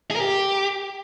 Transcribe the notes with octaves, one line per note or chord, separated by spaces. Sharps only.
G#4
A#4
G4